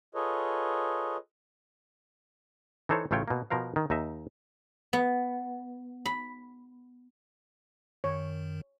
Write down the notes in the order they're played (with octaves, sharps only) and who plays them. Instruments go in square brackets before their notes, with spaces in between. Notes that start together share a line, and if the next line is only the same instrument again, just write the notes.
[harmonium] F4 G#4 A4 B4 C#5 D#5
[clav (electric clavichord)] E3 D#4 A4 C5 C#5
A1 C#3 A3 F4 C#5 G5
B2 A#3
B2 F3 A#4 C5 F5
D#3
D#2 D#4 D#5 E5
[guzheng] B3
B5
[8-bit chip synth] F#2 D#3 [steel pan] C#5